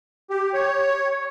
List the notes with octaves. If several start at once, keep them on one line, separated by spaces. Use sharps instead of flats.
G4
C#5